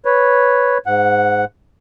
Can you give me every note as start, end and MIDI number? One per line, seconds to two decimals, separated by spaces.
0.05 0.78 71
0.05 0.78 73
0.86 1.45 44
0.86 1.45 78